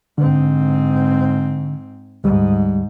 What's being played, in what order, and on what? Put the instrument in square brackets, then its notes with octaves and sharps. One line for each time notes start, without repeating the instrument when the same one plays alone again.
[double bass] G#2 C4 [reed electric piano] D3
[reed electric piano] D2 G3 [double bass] G#2